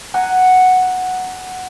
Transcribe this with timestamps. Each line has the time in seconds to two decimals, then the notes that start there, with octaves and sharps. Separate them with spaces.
0.14 F#5 G#5 A#5